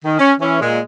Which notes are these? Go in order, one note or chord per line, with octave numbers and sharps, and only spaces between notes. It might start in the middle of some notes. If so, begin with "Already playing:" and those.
D#3
C#4
E3 C#4
A#2 G#3